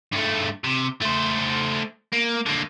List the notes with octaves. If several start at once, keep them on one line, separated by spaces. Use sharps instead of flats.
G2 A3
C3
A3 C5
A#3
D3 A#3